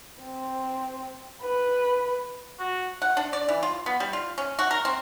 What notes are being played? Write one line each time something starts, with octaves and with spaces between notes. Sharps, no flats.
C4
B4
F#4
F#5
D4
D5
E3
F4
B3
G3
F4
C#4
F#4
A#4
C4